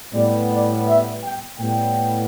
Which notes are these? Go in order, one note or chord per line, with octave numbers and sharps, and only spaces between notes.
A2 G3 B3 D5
D5
E5
G5
A2 G3 B3 G5